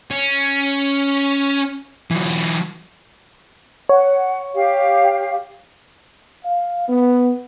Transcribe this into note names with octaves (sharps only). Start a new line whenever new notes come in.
C#4
E3 F#3
C#5 F#5
G4 F5
F5
B3